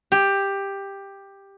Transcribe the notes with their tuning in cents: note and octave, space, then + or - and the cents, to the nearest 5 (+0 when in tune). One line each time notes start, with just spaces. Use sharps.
G4 +10